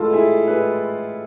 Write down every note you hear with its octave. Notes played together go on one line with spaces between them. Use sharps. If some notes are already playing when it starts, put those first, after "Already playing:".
Already playing: A2 E3 G#3 F4 A4
E4 G#4
A2 E3 G#3 G#4 B4